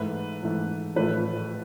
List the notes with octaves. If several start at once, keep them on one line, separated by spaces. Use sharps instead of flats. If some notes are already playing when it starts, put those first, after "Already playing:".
Already playing: G#2 E3 A3 B4
G#2 E3 A3
A1 A2 F3 A3 B4